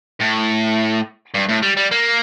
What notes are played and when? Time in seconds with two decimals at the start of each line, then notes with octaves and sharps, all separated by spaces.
0.21 A2
1.34 G2
1.49 A2
1.62 G3
1.77 G3
1.91 A#3